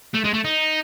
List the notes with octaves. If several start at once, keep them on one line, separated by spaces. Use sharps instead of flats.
A3
G#3
A3
D#4